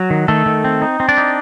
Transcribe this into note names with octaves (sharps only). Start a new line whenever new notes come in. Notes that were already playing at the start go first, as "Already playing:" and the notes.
Already playing: F#3 F#4
D#3
D#3 A3 A4
D#3
C4
D#4
C4
D4 D5
D#4